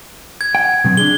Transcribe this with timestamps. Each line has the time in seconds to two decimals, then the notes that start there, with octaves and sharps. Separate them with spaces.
0.41 G#6
0.55 F#5 G5
0.84 B2 F#3 C4
0.97 D4 G#4 G7